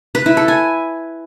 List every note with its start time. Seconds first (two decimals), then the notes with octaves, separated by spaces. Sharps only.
0.15 B4
0.26 E4
0.37 A4
0.48 G#5